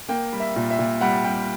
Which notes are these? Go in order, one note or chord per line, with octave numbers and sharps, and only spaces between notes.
A#3 G5
G3
E5
A#2
E5
A#2
G3 F#5
G3 G5